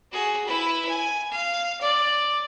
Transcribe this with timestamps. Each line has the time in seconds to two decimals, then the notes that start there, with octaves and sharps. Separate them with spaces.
0.12 F#4 G#4
0.46 E4 B4
0.88 G#5
1.31 F5
1.81 D5